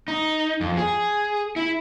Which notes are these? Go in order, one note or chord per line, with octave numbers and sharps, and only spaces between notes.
D#4
F2
G#4
E4